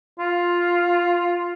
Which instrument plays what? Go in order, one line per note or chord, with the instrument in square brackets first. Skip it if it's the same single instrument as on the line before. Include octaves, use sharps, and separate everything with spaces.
[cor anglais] F4